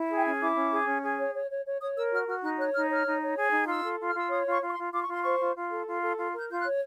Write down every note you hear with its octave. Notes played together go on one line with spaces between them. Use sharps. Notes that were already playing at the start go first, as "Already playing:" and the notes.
Already playing: E4
G#4
G5
C#4 G#5
E4 D6
C#4
G#4
C#4
G#4
C#5
C#5
C#5
C#5
C#5 D#6
A#4 E6
F#4 F6
F#4 F6
D#4 F#6
C#5 F#6
D#4 F6
C#5 F6
D#4
C#5
G#4
D#4
F4 E6
A4
F4
F6
F4 E6
C#5 D#6
F4 C#6
F4
C#6
C6
F4
F4 D6
C#6
F4 C6
C5 C#6
F4
F4
A4
F4
A4
F4
A#4 G6
F4 G6
F#6
C#5